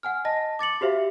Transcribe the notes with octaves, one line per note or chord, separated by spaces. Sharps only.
F#5 G#5 F6
D#5 A5 A#6
D6 A6 C#7 F#7
F#4 G4 C5 E5 F5